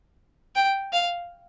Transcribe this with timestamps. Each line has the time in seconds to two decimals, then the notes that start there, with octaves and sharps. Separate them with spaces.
0.56 G5
0.93 F5